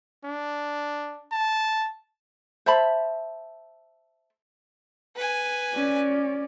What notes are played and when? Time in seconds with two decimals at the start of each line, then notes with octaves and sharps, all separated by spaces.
0.25 D4
1.32 A5
2.66 C5 E5 A5 B5
5.16 B4 G#5
5.74 C#4 D5